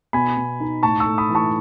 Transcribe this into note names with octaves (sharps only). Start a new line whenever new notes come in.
B2 G#5 B5
B2
D#4
A2 A5 C#6
C#6 E6
A3
B5 D#6
E3
A5 C#6